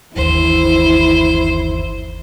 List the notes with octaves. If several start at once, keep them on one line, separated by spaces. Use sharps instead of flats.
G1 D#2 E3 E4 C5